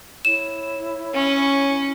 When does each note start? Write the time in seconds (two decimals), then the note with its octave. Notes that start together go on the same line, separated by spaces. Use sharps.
0.25 E4 C#5 E7
1.14 C#4